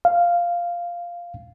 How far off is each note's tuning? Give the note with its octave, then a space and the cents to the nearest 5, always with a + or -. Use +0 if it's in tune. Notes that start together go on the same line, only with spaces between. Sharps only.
F5 -5